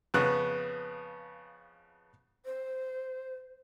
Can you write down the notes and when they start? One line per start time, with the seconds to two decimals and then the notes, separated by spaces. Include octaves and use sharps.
0.14 F2 C#3 B3 F#6
2.45 C5